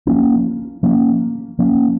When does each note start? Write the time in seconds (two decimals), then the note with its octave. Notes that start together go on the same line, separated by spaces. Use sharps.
0.07 F3 A#3 C#4
0.83 F3 A#3 C#4
1.59 F3 A#3 C#4